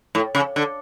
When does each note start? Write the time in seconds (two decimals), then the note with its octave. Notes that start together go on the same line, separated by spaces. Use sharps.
0.15 A2
0.35 C#3
0.56 D3